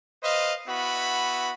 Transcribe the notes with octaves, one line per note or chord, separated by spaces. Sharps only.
B4 C5 D#5 F5
B3 E4 F#4 B5